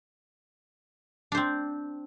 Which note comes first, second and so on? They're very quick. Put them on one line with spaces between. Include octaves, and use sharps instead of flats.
D4 C5 C4